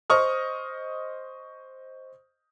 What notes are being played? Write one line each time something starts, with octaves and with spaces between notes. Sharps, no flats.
C5 D#5 C#6 D#6 F6